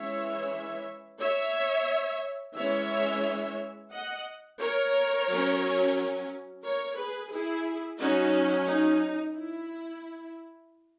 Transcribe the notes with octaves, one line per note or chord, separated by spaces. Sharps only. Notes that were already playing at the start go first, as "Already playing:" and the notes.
Already playing: E3 G#3 C#4 C#5 E5
C#5 E5
E3 G#3 C#4 C#5 E5
D#5 F#5
A#4 C#5
F#3 C#4
A#4 C#5
G#4 B4
E4 G#4
F#3 C#4 D#4 F#4
D#4
E4